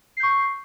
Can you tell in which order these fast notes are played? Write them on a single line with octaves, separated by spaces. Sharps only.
C7 G6 C#6